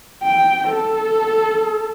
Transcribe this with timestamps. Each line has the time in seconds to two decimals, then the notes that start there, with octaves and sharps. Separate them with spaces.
0.22 G5
0.68 A4